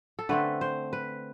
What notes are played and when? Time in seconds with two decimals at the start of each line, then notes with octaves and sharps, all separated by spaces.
0.19 A4
0.29 D3 A3 C4 B4
0.61 C5
0.93 B4